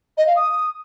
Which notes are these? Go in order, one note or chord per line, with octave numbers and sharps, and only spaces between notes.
D#5
F5
D#6